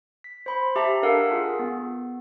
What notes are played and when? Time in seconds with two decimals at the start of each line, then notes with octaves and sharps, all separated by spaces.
0.24 B6
0.46 C5 B5 C6
0.76 G4 E5 A5 A#5
1.03 D4 A4 A#4 F5 F#5
1.31 F4 G#4
1.59 B3